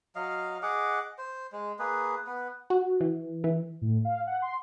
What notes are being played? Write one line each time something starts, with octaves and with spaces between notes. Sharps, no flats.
F#3 D#5 F5
G#4 D#5 F#5 D6
C5
G#3
A#3 G#4 B4
B3 B4
F#4
E3
E3
A2
F5
F#5
C6